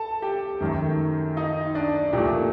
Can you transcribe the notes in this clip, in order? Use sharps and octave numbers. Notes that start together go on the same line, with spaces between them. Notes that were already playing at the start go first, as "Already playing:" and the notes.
Already playing: A4 A5
G4 G5
F#2 D#3 A3
D#4 D#5
D4 D5
A#2 A3 G4